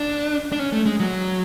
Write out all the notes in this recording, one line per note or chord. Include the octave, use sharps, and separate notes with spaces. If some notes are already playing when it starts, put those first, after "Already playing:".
Already playing: D4
D4
C#4
A3
G#3
F#3